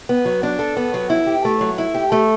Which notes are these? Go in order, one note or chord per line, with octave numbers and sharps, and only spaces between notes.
B3
F#3
D4
A4
B3
F#3
E4
G4
A3
F#3
E4
G4
A3